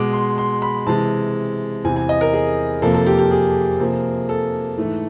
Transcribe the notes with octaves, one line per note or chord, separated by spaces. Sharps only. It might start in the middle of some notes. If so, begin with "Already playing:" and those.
Already playing: B2 G#3 D6
C6
C6
B5
C3 E3 G#3 A5
E2 C3 E3 G#5
G#5
D#5
A#4
G#4
F2 C3 F3 A#3 A4
A4
G4
G4
G#4
C3 F3 A#3
A4
G#2 E3 A3